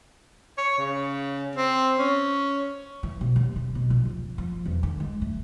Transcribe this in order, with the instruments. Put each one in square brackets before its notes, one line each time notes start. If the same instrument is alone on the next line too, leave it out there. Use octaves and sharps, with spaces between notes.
[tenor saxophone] C#5
C#3
C4
C#4
[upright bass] E3
B2
D#2
C3
B2
A#1
F2
F3
E2
D3
G#3
A3